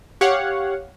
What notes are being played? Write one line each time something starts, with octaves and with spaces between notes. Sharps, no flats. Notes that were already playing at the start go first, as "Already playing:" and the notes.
G4 C#5 F5 F#5